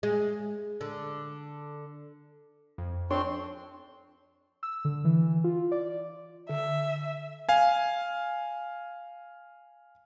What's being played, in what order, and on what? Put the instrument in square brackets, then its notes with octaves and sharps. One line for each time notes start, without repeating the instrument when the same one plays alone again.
[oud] G#3
D3
[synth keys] F2
[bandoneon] F2 C4 C6 [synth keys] D4 [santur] C#5 C#6
[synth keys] E6
D3
E3
F4
D5
[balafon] D3 [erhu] E5
[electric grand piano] F5 G#5